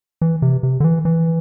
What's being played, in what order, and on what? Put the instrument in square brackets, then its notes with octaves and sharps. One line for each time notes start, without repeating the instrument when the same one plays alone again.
[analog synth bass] E3
C3
C3
D3
E3
E3